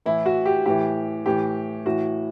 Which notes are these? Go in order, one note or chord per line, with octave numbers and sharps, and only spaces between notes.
A2 E3 E4
F#4
G4
A2 E3 G4
A2 E3 G4
A2 E3 F#4